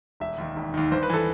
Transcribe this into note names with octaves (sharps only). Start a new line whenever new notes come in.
E1 E5
D#2 D#3
E1
D#2 D#3
G1 C5
B4
E3 A4